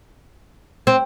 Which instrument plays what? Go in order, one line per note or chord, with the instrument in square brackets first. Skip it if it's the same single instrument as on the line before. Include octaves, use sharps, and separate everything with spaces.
[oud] C4